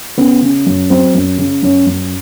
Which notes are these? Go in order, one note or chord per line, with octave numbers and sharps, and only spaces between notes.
C#3 B3
C#3
F#2
F#3 C4
F#2
C#3
F#2 C#4
F#2